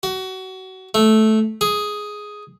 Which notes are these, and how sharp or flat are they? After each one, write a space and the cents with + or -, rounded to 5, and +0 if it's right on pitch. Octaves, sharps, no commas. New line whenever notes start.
F#4 +25
A3 -10
G#4 +5